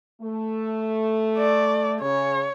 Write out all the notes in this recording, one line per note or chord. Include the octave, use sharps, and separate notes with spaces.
A3
D5
C#3 C#5